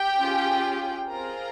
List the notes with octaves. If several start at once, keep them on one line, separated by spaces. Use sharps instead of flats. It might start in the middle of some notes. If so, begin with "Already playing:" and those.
Already playing: G4 G5
C#4 F4 G#4
C4 F4 G#4 A#4 A#5